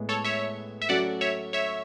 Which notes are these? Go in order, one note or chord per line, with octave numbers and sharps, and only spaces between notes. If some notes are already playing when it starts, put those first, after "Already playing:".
Already playing: A2 G#3 B3
A4 C#5
C#5 E5
E5
F#3 A3 C#4 F#4 D5 F#5
C#5 E5
C#5 E5